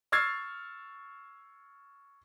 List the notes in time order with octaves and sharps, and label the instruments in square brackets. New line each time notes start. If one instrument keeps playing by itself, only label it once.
[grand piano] C#6 E6 F6 G#6 A6 C7